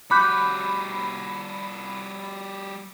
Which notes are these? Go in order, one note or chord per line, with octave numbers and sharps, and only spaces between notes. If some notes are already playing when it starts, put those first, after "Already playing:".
G3 F#4 B5 D6 F#6 G6